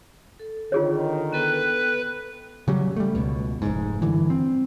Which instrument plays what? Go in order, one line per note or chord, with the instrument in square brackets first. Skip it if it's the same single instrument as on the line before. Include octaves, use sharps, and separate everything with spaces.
[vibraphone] A4
[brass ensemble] D3 D#3 [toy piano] F4 G#4 C#5
[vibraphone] B3 A4 G5 [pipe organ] B4
[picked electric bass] C#3 F#3 G3
G3 A3
C#2 B2
F1 G#2
G2 D3 E3
C4